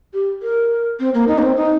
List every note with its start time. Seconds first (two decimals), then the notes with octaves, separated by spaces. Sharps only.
0.14 G4
0.42 A#4
1.00 C4
1.14 A#3
1.28 D#4
1.39 A#3
1.42 C4
1.57 D#4